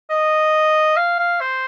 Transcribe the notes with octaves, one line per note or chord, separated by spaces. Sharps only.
D#5
F5
F5
C5